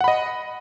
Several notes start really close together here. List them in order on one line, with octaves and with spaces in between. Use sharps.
F#5 B5 D#5